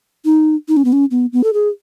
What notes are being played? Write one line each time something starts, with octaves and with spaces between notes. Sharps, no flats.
D#4
D#4
C#4
B3
C#4
B3
B3
A4
G#4